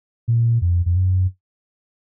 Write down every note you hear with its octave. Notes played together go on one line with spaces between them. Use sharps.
A#2
F2
F2
F#2